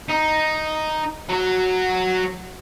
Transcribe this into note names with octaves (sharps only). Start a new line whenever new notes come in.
D#4
F#3 F#4